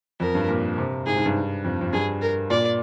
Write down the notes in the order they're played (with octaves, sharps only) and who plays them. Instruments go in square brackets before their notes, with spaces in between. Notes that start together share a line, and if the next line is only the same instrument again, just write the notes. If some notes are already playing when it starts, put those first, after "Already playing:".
[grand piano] F2 [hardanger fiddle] A#4
[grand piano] G2
A#2
C3
[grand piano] G#2 [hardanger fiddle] G#4
[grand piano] G#2
G2
F2
F2
[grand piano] G2 [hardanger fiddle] G#4
[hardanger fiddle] A#4
[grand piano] A#2 [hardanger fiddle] D5